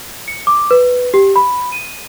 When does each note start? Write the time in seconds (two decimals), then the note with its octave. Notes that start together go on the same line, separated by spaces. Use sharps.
0.28 C#7
0.47 D6
0.71 B4
1.14 G4
1.36 B5
1.72 D#7